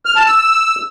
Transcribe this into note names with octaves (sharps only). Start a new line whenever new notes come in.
F6
A5
E6